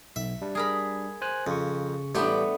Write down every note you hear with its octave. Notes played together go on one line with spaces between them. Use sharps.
B1 E5
G3 D4
G#4 A#4 B5
C5 G#5 F#6
F2 C#3 C#6
A1 G3 A3 B3 D4 G4